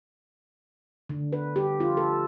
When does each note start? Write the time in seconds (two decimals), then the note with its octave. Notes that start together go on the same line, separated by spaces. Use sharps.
1.09 D3
1.33 B4
1.56 G4
1.80 F4
1.97 A4